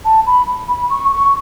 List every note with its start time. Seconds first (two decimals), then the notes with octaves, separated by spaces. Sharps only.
0.05 A5
0.27 B5
0.69 B5
0.90 C#6
1.12 C#6